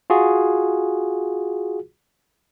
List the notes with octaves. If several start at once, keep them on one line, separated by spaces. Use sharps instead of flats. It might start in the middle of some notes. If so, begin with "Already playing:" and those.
F4 F#4 G#4